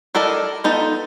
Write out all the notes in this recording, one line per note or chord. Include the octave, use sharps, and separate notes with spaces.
E4 A4 A#4 D5 D#5
B3 D#4 F4 A4